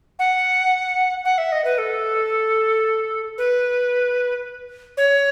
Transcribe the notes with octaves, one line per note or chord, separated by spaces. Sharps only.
F#5
F#5
E5
D#5
B4
A4
B4
C#5